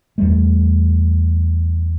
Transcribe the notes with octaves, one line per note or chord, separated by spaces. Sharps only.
E2 G3 A3